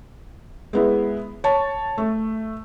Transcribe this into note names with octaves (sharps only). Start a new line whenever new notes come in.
G#3 B3 E4
C#5 A5
A3